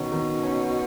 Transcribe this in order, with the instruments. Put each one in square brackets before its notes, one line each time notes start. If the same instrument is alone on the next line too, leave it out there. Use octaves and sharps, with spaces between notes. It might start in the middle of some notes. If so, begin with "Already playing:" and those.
Already playing: [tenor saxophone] B2 [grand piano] D#3 C#4
[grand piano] D#3
C#4